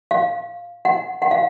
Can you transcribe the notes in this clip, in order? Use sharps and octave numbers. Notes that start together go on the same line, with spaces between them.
F5
F#5
F#5
F5